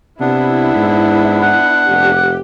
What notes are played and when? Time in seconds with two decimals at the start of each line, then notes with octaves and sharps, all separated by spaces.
0.20 C3 B3 D4 E4
0.75 G#2
1.42 F#5
1.88 F1 G4